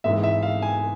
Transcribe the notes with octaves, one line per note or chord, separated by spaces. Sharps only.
G#1 G#2 E3 E5
E5
F5
G#5